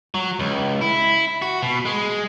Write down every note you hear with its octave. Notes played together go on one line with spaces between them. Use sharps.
F#3
C#2
E4
F#4
B2
G#3